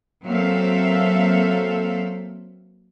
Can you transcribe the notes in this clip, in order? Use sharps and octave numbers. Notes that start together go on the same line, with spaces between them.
F#3 A#3 C4 A4 E5 F5